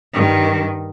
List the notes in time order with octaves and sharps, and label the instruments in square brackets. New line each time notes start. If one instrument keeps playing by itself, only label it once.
[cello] G2 D#3